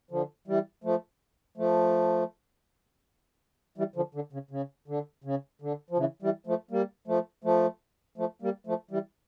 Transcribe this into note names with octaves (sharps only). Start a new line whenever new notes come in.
D3 F3
E3 G3
F3 A3
F3 A3
E3 G3
D3 F3
D3
C#3
C#3
D3
C#3
D3
F3
C#3 E3
E3 G3
F3 A3
G3 A#3
F3 A3
F3 A3
F3 A3
G3 A#3
F3 A3
E3 G3